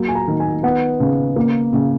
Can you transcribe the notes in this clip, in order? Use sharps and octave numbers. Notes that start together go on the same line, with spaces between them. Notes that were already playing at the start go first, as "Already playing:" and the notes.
Already playing: F#3 A#3
G#5
A#5
D#3
G#5
B3 F#5
C#3
A#3
C#3